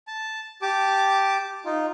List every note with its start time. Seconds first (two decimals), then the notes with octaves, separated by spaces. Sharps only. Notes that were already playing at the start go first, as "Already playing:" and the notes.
0.07 A5
0.62 G4 A5 D6
1.65 D#4 F4